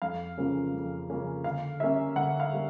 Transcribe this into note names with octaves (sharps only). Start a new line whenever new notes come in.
F2 F5
C#3 F3 A#3 C#4
F2
C#3 F3 A#3 C#4
D3 F5
G3 A#3 C#4 E5
D3 F#5
F5
G3 A#3